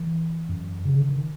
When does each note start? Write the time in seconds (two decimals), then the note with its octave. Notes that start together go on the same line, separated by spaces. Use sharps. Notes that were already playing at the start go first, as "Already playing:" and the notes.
Already playing: E3
0.49 F#2
0.85 C#3
0.94 D3
1.09 D#3